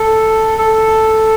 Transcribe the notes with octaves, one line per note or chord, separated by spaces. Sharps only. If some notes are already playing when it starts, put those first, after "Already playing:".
Already playing: A4
A4